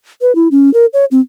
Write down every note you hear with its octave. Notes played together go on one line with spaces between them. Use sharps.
B4
E4
C#4
A#4
C#5
C4